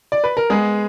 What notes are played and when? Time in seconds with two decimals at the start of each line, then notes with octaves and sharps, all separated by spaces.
0.12 D5
0.24 B4
0.37 A#4
0.50 G#3 B3 G#4